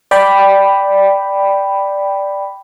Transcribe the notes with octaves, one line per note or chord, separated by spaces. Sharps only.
D5 G5 B5